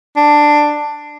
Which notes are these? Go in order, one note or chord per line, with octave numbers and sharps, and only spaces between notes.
D4